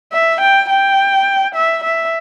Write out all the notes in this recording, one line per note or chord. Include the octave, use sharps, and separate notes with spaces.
E5
G5
G5
E5
E5